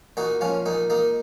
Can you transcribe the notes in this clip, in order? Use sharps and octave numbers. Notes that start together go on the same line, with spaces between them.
A#2 D#4 F#4
F3 C#4 F4
A#2 D#4
A#3 D#4